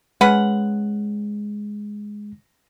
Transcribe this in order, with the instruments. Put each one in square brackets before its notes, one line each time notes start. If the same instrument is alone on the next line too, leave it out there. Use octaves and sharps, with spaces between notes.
[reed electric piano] G#3 [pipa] C#4 B4 F#5